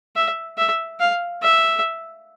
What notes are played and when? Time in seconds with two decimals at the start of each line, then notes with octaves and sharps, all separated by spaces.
0.16 E5
0.58 E5
1.00 F5
1.43 E5